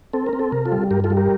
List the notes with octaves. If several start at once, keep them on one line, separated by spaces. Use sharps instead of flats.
C4 A4
A#4
C4
A4
C3 A#4
F4 A4
G3
G2 G4 A#4
F4 A4
G3
G4 A#4